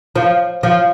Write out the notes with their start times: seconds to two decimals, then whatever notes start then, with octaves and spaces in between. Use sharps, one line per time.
0.16 F3
0.63 F3